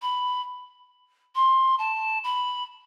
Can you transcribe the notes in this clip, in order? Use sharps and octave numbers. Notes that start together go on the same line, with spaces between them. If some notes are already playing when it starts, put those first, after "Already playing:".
B5
C6
A5
B5